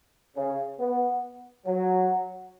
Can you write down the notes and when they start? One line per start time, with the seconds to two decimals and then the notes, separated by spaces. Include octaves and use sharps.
0.36 C#3
0.80 B3
1.66 F#3